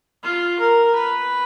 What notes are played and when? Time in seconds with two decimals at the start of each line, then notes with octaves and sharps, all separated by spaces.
0.24 F4
0.59 A#4
0.95 B4